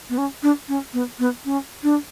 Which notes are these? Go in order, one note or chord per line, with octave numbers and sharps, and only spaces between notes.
B3
C#4
D4
C#4
B3
B3
C#4
D4